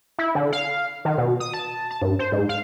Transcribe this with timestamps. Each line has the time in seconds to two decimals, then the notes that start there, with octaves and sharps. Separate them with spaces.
0.19 E4
0.35 D3
0.53 F5
1.05 D#3
1.18 B2
1.40 D#6
1.54 A5
1.91 A5
2.02 G2
2.19 C5
2.32 G#2
2.49 F5